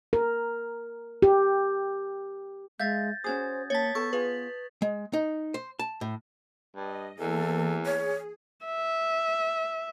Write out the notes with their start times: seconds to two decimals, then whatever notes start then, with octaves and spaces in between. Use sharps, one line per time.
0.13 A#4
1.22 G4
2.80 G#3 E5 F5 G6 A6 A#6
3.24 C#4 F#4 G#4 C5 D#6 G#6
3.70 A#3 C#5 A5 G#6 A6 B6
3.95 B3 A4 A5 C#6
4.13 F4 G#4 B4
4.82 G#3
5.13 D#4
5.54 C5
5.79 A5
6.01 A2
6.76 G2 D#5
7.19 E2 E3 A#3 A4
7.86 G#4 C#5
8.66 E5